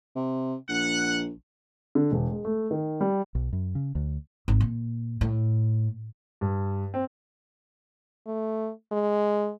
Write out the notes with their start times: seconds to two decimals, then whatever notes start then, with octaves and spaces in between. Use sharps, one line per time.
0.15 C3
0.69 A#1 F#5
1.95 D3
2.12 E1
2.31 G#3
2.45 A3
2.71 D#3
3.01 G3
3.35 B1
3.53 F#2
3.75 C#3
3.95 D2
4.48 G#1
4.60 A#2
5.21 A2
6.41 G2
6.94 C4
8.27 A3
8.92 G#3